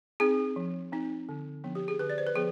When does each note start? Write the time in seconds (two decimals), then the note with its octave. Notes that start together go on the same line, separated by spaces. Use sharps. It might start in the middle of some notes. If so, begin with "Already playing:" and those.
0.20 C4 D#4 G#4
0.56 F3
0.92 C4 D#4
1.29 D3
1.64 F3 B3 D4
1.75 G4
1.88 G#4
1.99 D3 B4
2.10 D5
2.18 C5
2.27 B4
2.35 F3 B3 G#4